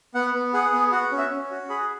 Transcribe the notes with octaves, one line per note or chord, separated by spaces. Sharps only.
B3 F#5
B3
G#4 F#5
B3
F#4 F#5
C#4
E5
C#4
F#4
G#4 B5